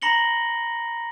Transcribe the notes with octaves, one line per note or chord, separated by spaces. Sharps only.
A#5 B5 A#6 C#7 F#7 G7